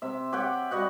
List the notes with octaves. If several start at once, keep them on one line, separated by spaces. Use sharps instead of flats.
C3 E5
G4 C#5 F#5 G5
G3 F#4 D#5 F#5